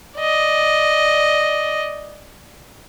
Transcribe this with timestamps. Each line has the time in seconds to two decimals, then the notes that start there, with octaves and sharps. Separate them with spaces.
0.17 D5 D#5